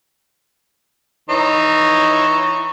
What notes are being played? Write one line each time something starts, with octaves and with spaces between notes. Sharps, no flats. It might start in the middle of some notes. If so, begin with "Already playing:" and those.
E3 D#4 C#5